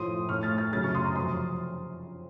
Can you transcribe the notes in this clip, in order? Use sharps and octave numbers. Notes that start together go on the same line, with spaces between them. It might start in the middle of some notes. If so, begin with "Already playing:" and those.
Already playing: A2 F3 A3 C6 D#6
A2 A3 C#6 F6
F6 A6
F6 A6
F#2 C#3 F#3 A3 F6 A6
C#6 F6
C6 D#6
A#5 C#6
F2 C3 F#3 C6 D#6